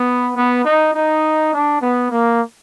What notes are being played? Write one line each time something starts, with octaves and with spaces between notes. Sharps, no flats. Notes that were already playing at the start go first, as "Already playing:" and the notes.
Already playing: B3
B3
D#4
D#4
D4
B3
A#3